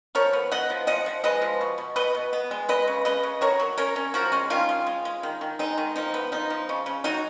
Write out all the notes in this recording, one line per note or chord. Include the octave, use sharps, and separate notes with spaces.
F3 A#4 C#5
B3
B3 D#5 F#5
F3
F3 D#5 F#5
F3
G#3 B4 D#5
F3
B2
B2
B2 B4 D#5
B2
B3
G#3
G#3 B4 D#5
C#3
C#3 B4 D#5
C#3
F#3 A#4 C#5
F#3
C#4 A#4 C#5
C#4
F3 F#4 A#4
G#3 C#4
D#3 C#4 F4
G#3
G#3
G#3
D#3
D#3
G#3 D#4
D#3
F3 D#4
B3
F3 D#4
F3
C#3
C#3
F#3 D#4 F#4